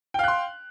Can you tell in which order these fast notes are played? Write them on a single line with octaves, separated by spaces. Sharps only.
G5 F5 F#6 C6